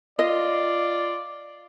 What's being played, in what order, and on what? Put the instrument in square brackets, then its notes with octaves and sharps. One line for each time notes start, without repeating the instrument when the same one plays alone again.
[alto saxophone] F4 [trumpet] D5 [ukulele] D#5